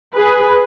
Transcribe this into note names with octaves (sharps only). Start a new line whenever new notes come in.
G#4 B4